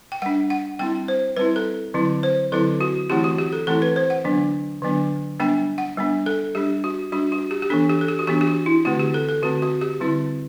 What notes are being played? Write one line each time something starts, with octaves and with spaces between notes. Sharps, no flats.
G5
G3 D4 F#5
F#5
G3 C4 E4 G5
C5
G3 C4 E4 B4
A4
D3 F#3 C4 E4
C5
D3 F#3 C4 E4 A4
F#4
E3 A3 C4 E4 G4
F#4
G4
A4
E3 A3 C4 E4 A4
B4
C5
F#5
D3 F#3 B3 D4
D3 F#3 B3 D4
G3 B3 D4 G5
F#5
G3 B3 D4
A4
G3 D4 G4
F#4
G3 D4 F#4
F#4
G4
G4
E3 B3 D4 A4
G4
A4
G4
F#4
E3 B3 D4 G4
G4
F#4
E4
D3 A3 C4 F#4
G4
A4
A4
D3 A3 C4 F#4
F#4
G4
D3 G3 C4 E4